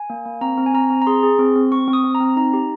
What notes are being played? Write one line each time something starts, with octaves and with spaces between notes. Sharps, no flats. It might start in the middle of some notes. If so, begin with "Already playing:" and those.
Already playing: G#5
A#3
A#3
C4 A#5
C4
G#5
C4 A#5
C4
A#5
G#4 C6
G#4
C4
C4
C4 C#6
C4
D#6
C4
A#5
C4
D#4 A#5
G4